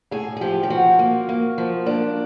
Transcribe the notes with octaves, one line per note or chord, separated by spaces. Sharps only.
A2 G#4
G#4
F3 G4
G4
F3 F#4
A#3
A#3
F3
A#3 D4